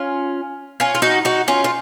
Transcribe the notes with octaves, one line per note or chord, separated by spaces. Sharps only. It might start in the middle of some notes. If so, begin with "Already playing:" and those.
Already playing: C#4 F4
C#4 F4
F4
D#4 F#4
D#4 F#4
C#4 F4
F4